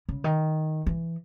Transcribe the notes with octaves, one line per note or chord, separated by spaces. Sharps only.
C#3
D#3
E3